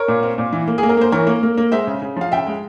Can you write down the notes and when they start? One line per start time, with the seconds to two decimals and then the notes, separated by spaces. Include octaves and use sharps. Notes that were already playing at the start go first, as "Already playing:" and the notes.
Already playing: A#4 C#5
0.08 A#2
0.23 C4
0.38 A#2
0.52 E3
0.68 A#3
0.78 G#4
0.83 A#3
0.89 A#4
0.97 A#3 C5
1.12 E3 A#4 C#5
1.27 A#3
1.43 A#3
1.57 A#3
1.72 G#3 C5 E5
1.87 C#3
2.02 C#3
2.16 F3 F5
2.32 C#3 E5 G5
2.47 G#3